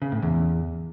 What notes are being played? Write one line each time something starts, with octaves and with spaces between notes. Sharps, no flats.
C#3
A2
E2